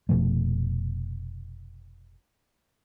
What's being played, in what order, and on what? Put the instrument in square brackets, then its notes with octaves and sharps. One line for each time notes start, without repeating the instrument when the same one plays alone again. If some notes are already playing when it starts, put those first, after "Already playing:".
[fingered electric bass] F1 B2 F3 A3